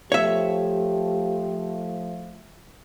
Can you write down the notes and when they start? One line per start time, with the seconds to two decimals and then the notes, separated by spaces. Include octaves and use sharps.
0.12 F3 A3 G4 C#5 E5